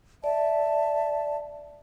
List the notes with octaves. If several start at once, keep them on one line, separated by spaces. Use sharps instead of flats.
D5 E5 A5